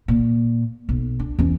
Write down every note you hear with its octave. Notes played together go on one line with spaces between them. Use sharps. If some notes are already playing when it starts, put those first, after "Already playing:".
A#2
B1
D4
E2 C#4